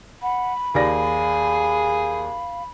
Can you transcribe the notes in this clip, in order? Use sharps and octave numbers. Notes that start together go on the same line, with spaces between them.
F#5 B5
D#2 G#4 D5 F5 A#6